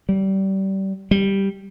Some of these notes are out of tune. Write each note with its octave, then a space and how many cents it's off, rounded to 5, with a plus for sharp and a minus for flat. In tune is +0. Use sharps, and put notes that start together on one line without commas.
G3 -25
G3 +0